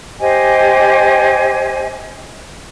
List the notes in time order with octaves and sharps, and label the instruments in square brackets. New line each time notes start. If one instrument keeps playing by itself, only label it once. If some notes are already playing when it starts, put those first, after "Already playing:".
[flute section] G4 C5 D#5 G#5